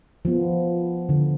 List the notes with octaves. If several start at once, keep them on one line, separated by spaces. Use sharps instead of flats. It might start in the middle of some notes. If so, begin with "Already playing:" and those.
F3 B3
D3